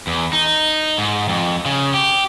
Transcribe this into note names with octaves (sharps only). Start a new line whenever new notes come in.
E2
D#4
G#2
F2
C#3
G4